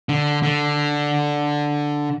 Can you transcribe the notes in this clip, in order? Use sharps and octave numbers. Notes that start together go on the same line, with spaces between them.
D3
D3